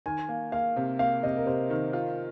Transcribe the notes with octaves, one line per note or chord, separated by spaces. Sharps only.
D#3 G#5
A#3
A#3 F5
C3
A#3 F5
C3 D#5
A#4
C3 C5
D#3 A#4
F4